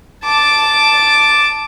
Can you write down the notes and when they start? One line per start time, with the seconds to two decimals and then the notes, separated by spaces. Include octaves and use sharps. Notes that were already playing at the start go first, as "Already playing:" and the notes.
0.25 A5 D6